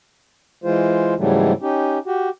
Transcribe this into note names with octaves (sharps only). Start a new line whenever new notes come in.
E3 G#3 F4 C5
G#2 C#3 E3 F#3 G3 A3
C#4 D#4 G4
F#4 G4